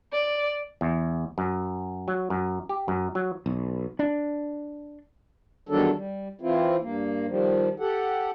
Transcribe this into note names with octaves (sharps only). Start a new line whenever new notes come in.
D5
E2
F#2
F#3
F#2
G4
F#2
F#3
B1
D4
E2 D#3 F#3 G3 D4 A4
G3
E3 C4 E4 F4
G2 A#3
D#3 F3 G3
G4 A4 F#5